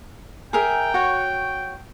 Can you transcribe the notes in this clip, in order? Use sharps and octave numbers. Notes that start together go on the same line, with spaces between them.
G#4 A#4 E5 G5
F#4 C#5 F#5